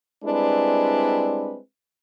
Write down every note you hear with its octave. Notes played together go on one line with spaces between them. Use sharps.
G3 G#3 C4 D4 E4 B4